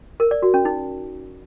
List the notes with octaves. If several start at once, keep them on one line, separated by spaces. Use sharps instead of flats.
A#4
D5
F#4
C#4
D#4